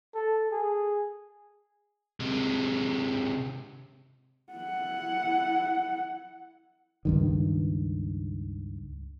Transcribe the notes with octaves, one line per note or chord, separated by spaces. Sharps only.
A4
G#4
C3 G#3
E4 F#5
C#2 G2 D#3